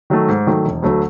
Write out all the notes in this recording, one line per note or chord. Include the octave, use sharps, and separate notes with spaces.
D#3 F#3 A3
G#2
D#3 F#3 A3
E1
D2 D3 F#3 A3